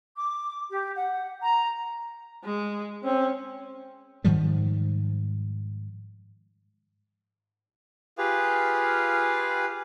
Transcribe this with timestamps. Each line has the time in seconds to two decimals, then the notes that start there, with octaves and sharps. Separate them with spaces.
0.15 D6
0.70 G4
0.95 F#5
1.41 A#5
2.44 G#3
3.04 C4 C#4
4.24 G#2 D#3 F3 G3
8.18 F4 G4 G#4 B4 F5